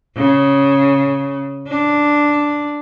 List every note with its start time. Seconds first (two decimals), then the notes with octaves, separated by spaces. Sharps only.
0.17 C#3
1.68 D4